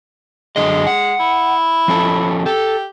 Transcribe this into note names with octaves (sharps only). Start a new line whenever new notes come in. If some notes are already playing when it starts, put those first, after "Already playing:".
F#2 D3 G#3 D#5
F#5
E4
F3 C#4 A4
G4 A4